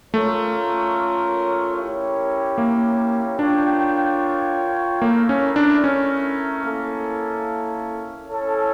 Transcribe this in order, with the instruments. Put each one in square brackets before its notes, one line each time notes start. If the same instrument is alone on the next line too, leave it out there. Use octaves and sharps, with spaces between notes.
[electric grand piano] A3 [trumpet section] C#4 F4 A#4 C#5
[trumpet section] C#4 E4 G4 A#4 C#5
[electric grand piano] A#3
[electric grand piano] D4 [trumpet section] F4 A#4 C#5 G5
[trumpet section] A3 E4 A#4 [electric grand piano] A#3
[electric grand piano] C#4
D4
C#4
[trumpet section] A#3 E4 A4
C#4 E4 A4